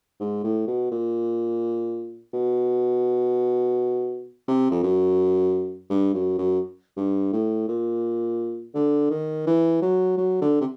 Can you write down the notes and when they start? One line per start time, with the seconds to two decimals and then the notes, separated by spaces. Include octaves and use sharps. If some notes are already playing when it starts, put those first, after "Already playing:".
0.20 G#2
0.44 A2
0.67 B2
0.91 A#2
2.33 B2
4.48 C3
4.71 F2
4.83 F#2
5.90 G2
6.14 F#2
6.38 F#2
6.97 G2
7.33 A2
7.68 A#2
8.75 D3
9.10 D#3
9.47 E3
9.82 F#3
10.18 F#3
10.41 D3
10.61 C3